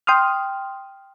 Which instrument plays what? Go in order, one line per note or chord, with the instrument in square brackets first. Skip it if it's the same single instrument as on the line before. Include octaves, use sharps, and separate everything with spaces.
[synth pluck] G5 C6 D#6 F6